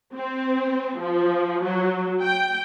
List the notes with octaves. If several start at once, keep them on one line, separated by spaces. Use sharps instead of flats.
C4
F3
F#3
G5